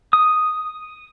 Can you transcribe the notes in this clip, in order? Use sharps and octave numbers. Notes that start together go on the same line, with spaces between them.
D#6